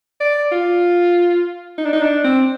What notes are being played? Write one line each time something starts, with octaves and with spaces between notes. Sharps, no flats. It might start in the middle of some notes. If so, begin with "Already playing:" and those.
D5
F4
D#4
D4
D#4
D4
C4